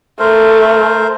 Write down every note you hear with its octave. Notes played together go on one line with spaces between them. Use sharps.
A3 A#4 C5